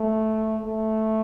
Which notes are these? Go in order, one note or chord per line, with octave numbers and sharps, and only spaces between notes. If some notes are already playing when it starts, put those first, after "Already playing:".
Already playing: A3
A3